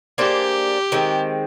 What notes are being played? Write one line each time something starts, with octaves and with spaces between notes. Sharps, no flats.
A#3 D4 G4 G#4 C5
D#3 G#3 C4